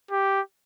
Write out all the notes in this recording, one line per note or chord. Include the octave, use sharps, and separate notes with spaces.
G4